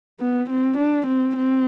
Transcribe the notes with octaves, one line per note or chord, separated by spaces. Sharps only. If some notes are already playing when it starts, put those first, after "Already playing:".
B3
C4
D4
C4
C4